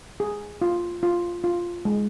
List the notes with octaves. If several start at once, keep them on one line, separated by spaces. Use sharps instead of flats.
G#4
F4
F4
F4
G#3